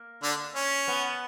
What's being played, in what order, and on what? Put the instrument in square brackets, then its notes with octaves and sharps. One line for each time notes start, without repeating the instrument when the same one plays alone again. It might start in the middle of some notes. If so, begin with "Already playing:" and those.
Already playing: [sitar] A#3
[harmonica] D3 D4
C#4
[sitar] B3